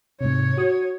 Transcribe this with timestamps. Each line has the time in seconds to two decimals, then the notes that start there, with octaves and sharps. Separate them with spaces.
0.21 G#2 C3 C#5
0.57 F#4 D#6